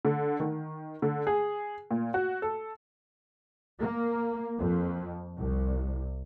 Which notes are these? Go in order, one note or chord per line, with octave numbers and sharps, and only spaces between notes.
D3
D#3
D3
G#4
A#2
F#4
A4
A#3
F2
C2